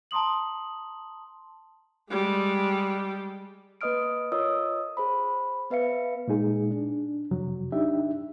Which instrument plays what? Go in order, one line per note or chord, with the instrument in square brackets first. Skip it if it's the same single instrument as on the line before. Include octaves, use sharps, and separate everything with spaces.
[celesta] A5 A#5 C6 D#6 F#7
[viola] G3 G#3
[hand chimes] A#3 B4 D#5 D#6 F6 D7
F4 A#4 C#5 D#5 D#6 E6
G#4 C5 B5
B3 B4 E5 F5 C#7
[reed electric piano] A#2 G#3 D#4 G#4
D4
F2 C3 F#3
D4 D#4 G4 E5